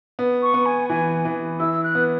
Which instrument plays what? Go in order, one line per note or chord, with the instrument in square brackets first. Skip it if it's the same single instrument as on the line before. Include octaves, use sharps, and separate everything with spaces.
[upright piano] B3
[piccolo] C#6
[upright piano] B3
[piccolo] G#5
[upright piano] E3 [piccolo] G#5
[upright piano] E3
[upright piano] E4 [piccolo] E6
[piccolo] F#6
[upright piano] B3